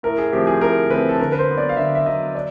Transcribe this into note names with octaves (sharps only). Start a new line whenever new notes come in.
A2 A#4
G#4
F3 A3 C4 G4
G#4
A2 A#4
F3 A3 C4 B4
A4
D3 A#4
B4
C5
F#3 B3
D5
F5
D3 E5
E5
F#3 B3 D#5
D5